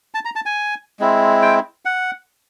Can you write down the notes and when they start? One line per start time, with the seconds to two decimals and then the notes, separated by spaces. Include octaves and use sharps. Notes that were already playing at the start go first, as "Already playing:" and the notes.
0.14 A5
0.25 A#5
0.36 A5
0.46 G#5
0.99 G#3 C4 E4
1.42 G5
1.85 F#5